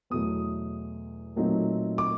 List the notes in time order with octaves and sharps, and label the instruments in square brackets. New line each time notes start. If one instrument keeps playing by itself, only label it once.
[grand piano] E2 B2 F#3 A3 D#6
A#2 F#3 A3 C4 D#4
D6